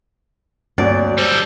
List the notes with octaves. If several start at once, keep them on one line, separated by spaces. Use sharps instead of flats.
D2 G2 F#3 A#3 C4 D5
G3 A4 C5